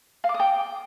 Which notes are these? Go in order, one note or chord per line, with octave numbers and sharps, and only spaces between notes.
F5
D6
D#6
G5